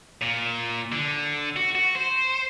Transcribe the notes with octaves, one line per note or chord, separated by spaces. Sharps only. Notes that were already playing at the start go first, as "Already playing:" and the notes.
A#2
D3
F#4
F#4
C5